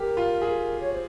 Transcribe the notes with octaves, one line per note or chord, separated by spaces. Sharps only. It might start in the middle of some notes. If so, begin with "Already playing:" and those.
Already playing: G4 A#4
F4
G#4
C#5
C5